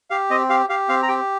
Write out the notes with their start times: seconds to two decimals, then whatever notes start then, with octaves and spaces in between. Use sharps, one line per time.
0.10 G4 F5
0.30 C4 D#5
0.50 G4 F5
0.69 G4 F5
0.89 C4 F5
1.03 A#5
1.08 G4 G5